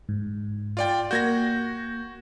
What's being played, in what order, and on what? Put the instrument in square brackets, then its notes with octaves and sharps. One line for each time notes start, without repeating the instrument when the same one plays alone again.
[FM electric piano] G#2
[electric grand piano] F4 D5 G5
[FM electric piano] A#3 G6 [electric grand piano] F#4 G#6 A#6